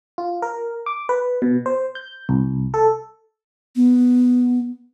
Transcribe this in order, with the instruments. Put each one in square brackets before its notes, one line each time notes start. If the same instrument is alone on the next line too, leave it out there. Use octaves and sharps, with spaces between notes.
[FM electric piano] F4
A#4
D6
B4
B2
C5
G6
C2
A4
[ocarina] B3